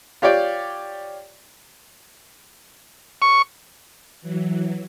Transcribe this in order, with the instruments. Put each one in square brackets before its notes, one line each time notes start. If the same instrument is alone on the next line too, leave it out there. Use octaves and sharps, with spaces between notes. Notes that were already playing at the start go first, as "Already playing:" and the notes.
[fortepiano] F4 G4 C#5 D5 G5
[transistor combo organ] C#6
[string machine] E3 F#3